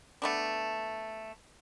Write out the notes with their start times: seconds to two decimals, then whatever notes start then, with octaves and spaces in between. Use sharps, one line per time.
0.22 A3 B3 D4